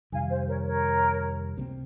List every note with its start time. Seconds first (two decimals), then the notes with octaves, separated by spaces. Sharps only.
0.12 F2 C3 D#3 G3 F5 G#5
0.30 C5
0.48 A#4 C#5
0.66 A#4 C#5
1.56 C#2 C3 G3 C4